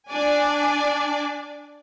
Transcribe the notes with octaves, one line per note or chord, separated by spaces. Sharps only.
D4 D5 G#5